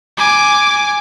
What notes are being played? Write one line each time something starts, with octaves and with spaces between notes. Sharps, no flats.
G#5 D6